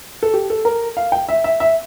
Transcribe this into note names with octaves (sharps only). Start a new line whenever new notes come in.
A4
G4
A4
A#4
F5
G5
E5
E5
E5